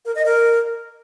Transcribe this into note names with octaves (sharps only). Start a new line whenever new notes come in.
A#4
D#5
A#4